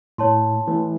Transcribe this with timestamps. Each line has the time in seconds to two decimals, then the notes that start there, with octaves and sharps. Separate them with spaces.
0.18 A2 C#5 A5 C6
0.67 E3 A3